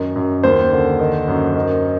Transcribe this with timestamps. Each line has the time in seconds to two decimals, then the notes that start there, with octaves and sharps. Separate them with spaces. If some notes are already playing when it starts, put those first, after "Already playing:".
Already playing: F#2 D#3
0.16 F#2
0.44 D#2 C5
0.72 D3
0.99 D#3
1.28 F#2
1.56 D#3